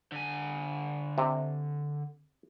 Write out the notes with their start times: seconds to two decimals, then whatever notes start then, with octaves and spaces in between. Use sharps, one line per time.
0.12 D3 G#5
1.18 C3